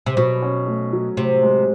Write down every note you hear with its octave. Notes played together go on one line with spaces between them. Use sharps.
C3
B2 F#3
C#4
A3
F#3
A2 C3
G#3